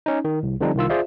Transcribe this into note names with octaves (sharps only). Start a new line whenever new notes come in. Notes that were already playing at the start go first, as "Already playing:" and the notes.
C#4 D#4
D#3
C2
D3 F3 G3 C4 D4 D#4
C2 D#3 F4 E6
F4 G#4 C5 D5 E5 F5